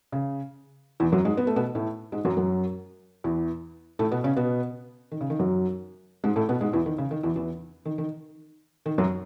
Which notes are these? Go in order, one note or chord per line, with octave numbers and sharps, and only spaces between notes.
C#3
E2 E3
F#2 F#3
G#2 G#3
B3
A3
B2 B3
A2 A3
G#2 G#3
F#2 F#3
F#2 F#3
E2 E3
A2 A3
B2 B3
C#3 C#4
B2 B3
D#3
C#3
D#3
F#2 F#3
G#2 G#3
A2 A3
B2 B3
G#2 G#3
E2 E3
D#3
C#3
D#3
E2 E3
E2 E3
D#3
D#3
D#3
F#2 F#3